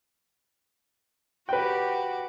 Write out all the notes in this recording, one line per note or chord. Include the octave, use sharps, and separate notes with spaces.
F#4 G4 B4 G5